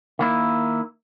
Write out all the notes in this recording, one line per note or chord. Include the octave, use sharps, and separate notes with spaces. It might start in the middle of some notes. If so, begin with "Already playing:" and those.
D#3 A#3 E4